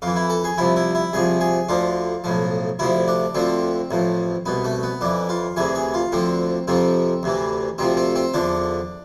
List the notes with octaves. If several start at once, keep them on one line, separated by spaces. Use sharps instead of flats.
F2 E3 F4
E4
A4
G#4
C2 C3 F3 E4
E4
E4
C2 C3 F3 G#4
G#4
D2 D3 F3 F4
B1 A2 F3
D2 C3 F3 E4
D4
D2 D3 F3 C4
A1 A2 F3
C2 B2 B3
A3
B3
F2 E3 D4
F4
D2 C3 E3 G#4
G#4
F4
D2 D3 F3 C4
F2 C3 F3 C4
D2 C3 E3
D2 C3 F3 C4
C4
C4
E2 D3 F3 D4